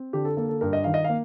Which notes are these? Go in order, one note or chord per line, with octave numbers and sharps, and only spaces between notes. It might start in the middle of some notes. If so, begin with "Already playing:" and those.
Already playing: C4
D3 G4
A4
A#3 A4
A4
G2 A#4
D#5
D#3 F5
D#5
A#3 F5